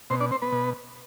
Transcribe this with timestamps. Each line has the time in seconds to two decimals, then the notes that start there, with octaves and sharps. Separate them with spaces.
0.10 B2 C4 C5
0.20 D4 D5
0.31 C4 C5
0.42 B3 B4
0.52 B2